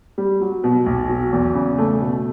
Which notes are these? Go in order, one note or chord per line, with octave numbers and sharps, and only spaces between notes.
G3
F#3
B2
B1
F#3
E2
C#3
A3
B2